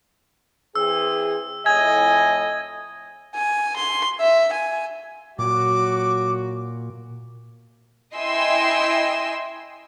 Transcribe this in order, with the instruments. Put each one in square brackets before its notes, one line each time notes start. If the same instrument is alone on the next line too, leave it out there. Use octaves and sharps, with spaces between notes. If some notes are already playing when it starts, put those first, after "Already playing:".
[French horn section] E3 C4 G#4 [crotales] E6
[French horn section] F2 A2 [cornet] D#5 [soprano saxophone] G#5 [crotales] G#6
[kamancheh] G#5
C6
E5
G#5
[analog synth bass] A#2 [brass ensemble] F#3 F#4 [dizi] D6
[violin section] E4 D#5 G5 G#5 C6 E6